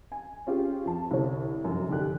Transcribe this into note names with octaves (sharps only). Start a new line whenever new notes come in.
G#5
C#4 F4 G4 G#4
F2 A5
C2 D3 C#5
F1 F#2
F1 D3 D#3 D4 G4 F#6